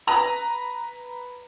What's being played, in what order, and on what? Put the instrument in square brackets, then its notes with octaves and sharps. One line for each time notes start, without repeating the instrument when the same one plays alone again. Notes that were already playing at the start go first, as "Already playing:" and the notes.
[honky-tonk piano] B4 A#5